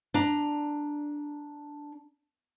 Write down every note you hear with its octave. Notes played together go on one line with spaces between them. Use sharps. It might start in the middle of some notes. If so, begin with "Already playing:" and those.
D4 A#5